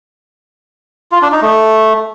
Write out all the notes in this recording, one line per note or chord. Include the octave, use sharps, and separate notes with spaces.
F4
D4
D#4
A3